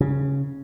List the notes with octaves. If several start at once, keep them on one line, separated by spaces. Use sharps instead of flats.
C#3